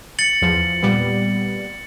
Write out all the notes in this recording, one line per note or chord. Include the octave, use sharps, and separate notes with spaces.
A6 C#7 F#7
E2 F3
A#2 G3 B3